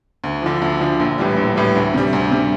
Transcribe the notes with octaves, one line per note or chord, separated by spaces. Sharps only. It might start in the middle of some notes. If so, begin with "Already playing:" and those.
D2
D3 F3
D2
D3 F3
A#1
A2 E3 G3
A#1
A2 E3 G3
D2
C3 G3
D2
C3 G3